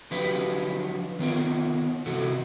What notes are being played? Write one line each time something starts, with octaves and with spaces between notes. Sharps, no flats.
D3 F3 F#3 G4 B4
D#3 B3 F4 A#4
C3 E3 F#4 A4